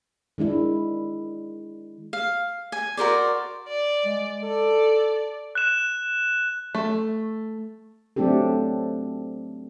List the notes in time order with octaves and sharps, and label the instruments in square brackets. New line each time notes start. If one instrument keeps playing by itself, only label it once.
[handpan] D#3 G#3 D4 E4
[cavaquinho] F5
G#5
F#4 A#4 C5 D5
[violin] D5
[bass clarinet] G#3
[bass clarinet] A4 [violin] D5
[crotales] F#6 E7
[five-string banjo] A3
[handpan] F#3 A3 C4 D4 G4 A4